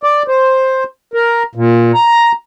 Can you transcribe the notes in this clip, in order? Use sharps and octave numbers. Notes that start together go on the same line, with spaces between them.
D5
C5
A#4
A#2
A#5